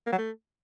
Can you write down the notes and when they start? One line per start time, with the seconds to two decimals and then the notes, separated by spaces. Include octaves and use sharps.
0.06 A#3
0.12 F#3
0.18 A3